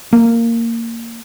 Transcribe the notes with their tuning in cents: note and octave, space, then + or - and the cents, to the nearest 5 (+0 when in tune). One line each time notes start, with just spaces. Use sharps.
A#3 -15